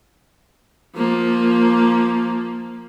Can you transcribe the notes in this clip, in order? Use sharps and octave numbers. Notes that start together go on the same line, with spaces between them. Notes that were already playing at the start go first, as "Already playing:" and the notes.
F3 A#3